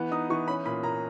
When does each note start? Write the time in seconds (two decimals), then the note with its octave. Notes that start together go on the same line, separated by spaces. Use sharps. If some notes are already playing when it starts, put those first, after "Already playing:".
Already playing: E3 B3
0.11 D#4 D#6
0.30 E3 C#6
0.48 C#4 B5
0.66 A#2 B5
0.83 A#2 A#5